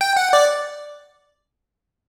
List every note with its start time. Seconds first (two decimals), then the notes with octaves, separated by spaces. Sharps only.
0.01 G5
0.17 F#5
0.33 D5